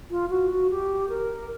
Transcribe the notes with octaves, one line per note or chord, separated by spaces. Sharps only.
F4
F#4
F#4
G4
A#4